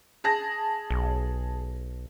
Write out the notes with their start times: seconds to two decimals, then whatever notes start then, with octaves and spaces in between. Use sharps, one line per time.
0.24 G#4 A5 A#6
0.90 B1